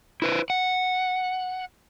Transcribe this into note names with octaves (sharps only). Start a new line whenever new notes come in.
E4 B4 C5
F#5